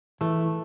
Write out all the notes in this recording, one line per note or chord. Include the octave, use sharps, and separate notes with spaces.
E3 A3